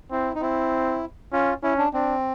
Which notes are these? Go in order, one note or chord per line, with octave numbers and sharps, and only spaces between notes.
C4 E4
D#4
C4 E4
C#4 F4
C#4 E4
D4
C4 D4